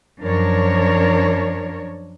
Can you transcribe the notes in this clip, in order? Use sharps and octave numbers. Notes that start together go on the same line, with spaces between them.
F#2 F3 D4 A#4 C#5